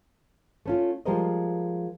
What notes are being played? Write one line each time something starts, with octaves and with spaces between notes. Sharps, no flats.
A3 C#4 F4
F3 G3 G#3 A#4 C5 D#5